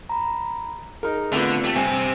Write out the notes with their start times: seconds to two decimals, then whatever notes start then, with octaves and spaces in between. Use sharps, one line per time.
0.09 A#5 B5
1.03 D#4 G#4 A#4
1.32 D3 A3 B3 C4 F4
1.64 A3 G4
1.76 G2 C3 C4 G#5